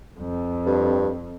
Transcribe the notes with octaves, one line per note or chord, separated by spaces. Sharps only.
F2
G2